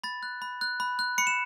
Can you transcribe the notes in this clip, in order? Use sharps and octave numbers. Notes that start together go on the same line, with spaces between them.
B5 A6
F#6
B5
F#6
B5
F#6
B5 C#7
E7